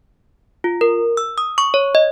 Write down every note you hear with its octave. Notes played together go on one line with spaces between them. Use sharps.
F4
A#4
E6
D#6
C#6
C#5
D#5